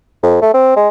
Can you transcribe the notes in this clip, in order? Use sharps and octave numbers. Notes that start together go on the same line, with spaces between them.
F2
A3
C4
G#3